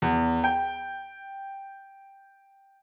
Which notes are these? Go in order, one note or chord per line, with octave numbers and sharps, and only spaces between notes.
E2
G5